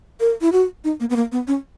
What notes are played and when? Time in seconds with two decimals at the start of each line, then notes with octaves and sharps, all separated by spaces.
0.20 A#4
0.41 E4
0.52 F#4
0.84 D#4
1.00 A#3
1.10 B3
1.16 A#3
1.32 B3
1.47 C#4